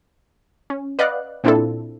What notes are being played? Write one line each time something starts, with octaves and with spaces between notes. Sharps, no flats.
C#4
B4 D5 D#5 F5 F#5 F#6
A#2 C4 D4 E4 F4 A4